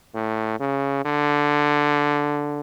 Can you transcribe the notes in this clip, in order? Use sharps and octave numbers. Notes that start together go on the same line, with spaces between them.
A2
C#3
D3